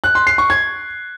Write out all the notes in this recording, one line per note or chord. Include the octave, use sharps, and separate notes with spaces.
F#6
C6
C7
C#6
G#6